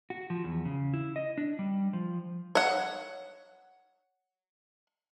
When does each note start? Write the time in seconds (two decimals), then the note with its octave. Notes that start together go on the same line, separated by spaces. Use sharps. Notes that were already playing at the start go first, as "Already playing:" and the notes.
0.10 F#4
0.30 F3
0.44 E2
0.65 C#3
0.94 E4
1.16 D#5
1.38 D4
1.59 G3
1.93 F3
2.55 C#5 F#5